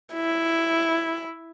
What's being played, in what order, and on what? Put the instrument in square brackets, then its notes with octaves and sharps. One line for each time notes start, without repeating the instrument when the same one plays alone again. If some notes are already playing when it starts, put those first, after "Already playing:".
[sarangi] E4